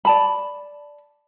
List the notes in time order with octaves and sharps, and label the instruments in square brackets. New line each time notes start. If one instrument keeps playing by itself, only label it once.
[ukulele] D5 A5 B5